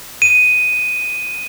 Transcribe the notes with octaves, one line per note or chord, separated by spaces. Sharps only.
D#7